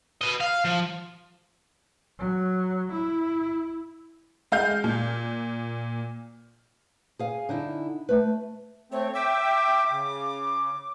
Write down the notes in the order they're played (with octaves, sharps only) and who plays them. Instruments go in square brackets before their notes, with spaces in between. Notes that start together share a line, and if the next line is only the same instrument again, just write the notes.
[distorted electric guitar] B4 D#5
F5
F3
[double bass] F#3
E4
[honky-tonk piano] G#3 F5 G6
A#2
[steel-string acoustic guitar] G#4 F5 G#5
D3 D#4 E4
A3 B4
[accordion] A3 C4 [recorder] C#5
[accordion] E5 G5 E6 [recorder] D6
[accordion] C#3